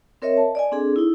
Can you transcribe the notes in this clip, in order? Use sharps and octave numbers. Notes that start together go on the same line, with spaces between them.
C4 A#4 C#5 D#5 E5
A5
D5 D#5 G#5
C4 D4 G#4 A4
D#4 E4